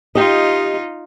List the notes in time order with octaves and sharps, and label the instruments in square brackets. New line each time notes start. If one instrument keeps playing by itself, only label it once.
[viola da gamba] D#4 F4 [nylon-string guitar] G4 D#5